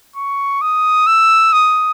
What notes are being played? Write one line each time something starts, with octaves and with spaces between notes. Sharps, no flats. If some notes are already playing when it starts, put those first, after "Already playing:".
C#6
D#6
E6
D#6